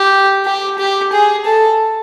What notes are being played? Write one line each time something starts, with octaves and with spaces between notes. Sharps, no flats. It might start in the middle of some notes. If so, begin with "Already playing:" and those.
Already playing: G4
G4
G4
G#4
A4